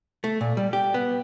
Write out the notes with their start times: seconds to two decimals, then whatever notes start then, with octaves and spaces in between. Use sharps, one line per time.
0.24 A3
0.41 A#2
0.57 G3
0.73 G4
0.94 B3